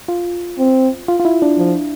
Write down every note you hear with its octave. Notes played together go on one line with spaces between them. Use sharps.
F4
C4
F4
F4
E4
D4
F3